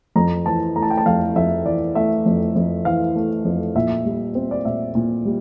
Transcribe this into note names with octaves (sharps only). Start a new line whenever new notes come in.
F2 A#5
E3 A5
A3 A#5
A5
G5
A5
F2 F5
F2 E5
E3 D5
A3 E5
F2
F2
E3 F5
A3
F2
A#2 E5
G3
C4
D5
A#2 E5
A#2
G3